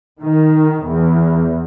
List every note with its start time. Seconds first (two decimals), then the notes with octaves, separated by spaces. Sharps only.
0.21 D#3
0.87 E2